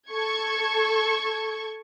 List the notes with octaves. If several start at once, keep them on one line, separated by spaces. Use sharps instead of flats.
A4 C#6 G#6